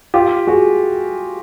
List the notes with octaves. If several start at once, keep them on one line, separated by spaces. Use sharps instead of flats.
F4 G4
F#4 G#4